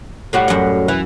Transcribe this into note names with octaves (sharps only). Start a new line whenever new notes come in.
A2 G3 F#4
F#2 F#5
E3 E4